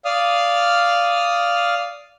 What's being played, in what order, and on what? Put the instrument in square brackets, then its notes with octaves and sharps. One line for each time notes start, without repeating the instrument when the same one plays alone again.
[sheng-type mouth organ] D5 F5 D#6 F6